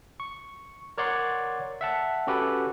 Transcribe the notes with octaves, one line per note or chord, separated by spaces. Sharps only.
C#6
A#4 C#5 D5 F#5 C6
E5 F#5 A5
C#4 F#4 G4 A4 B4